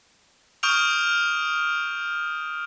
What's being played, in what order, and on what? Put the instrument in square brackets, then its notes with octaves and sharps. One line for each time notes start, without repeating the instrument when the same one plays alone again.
[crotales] C#6 D#6 F6 G6 D7 F7